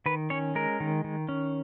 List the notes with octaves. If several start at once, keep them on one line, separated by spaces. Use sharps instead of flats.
D#3 B4
C#4 C#5
G#3 A#4
D#3
D#3
C#4